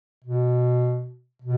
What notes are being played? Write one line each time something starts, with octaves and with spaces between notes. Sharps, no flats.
B2
B2